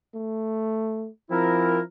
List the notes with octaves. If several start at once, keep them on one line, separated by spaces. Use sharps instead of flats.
A3
F3 C4 E4 A#4